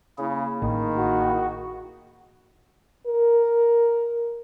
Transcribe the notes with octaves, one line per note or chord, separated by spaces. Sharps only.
C#3 A#3 E4 G#4
A1 D#3
F#4
A#4